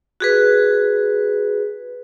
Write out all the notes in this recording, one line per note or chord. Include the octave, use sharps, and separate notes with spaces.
F#4 G#4 B4